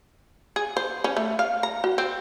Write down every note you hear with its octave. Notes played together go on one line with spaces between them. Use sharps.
G#4
C5
C#4
A3
F5
A#5
F#4
C4